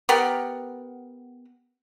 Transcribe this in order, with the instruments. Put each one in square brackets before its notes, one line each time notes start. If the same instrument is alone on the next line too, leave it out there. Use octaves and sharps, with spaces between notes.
[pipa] B3 G4 A#4 F#5